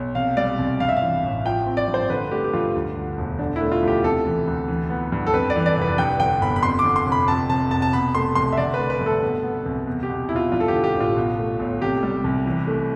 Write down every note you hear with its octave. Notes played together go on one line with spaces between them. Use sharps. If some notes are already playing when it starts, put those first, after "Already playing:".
Already playing: B1
C3 F5
G3 D5
C2
G2 F5
E5
F5
E3
A1
F3 G5
C4
D5
G2
C5
D3 B4
A3 G4
G4
G2 F4
D2
D3
E1
D3 D4
A3 E4
F4
D2
G4
C3 A4
E3
D2
E3
B3
G2
A4
F2 B4
D5
E3
D5
F1 B4
G2 G5
D3 G5
G1 B5
B5
F2 C6
D6
D3
C6
F1
B5
F2 A5
C3 A5
F1 A5
A5
B2 B5
A3 C6
C2 C6
E5
D3 D5
A3 B4
B4
G2
A4
B2
B3
C2
E2
G4
B2
E1 E4
F4
G2 F4
A4
D3 G4
G4
A1
F4
B2
A3
B1
C3 G4
G3
C2
E3
A3